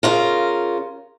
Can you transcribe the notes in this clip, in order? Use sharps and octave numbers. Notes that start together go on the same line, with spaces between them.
C#3 F4 A#4